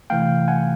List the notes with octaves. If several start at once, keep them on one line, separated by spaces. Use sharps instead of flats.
C3 E3 A3 F5 G5
F#5 G#5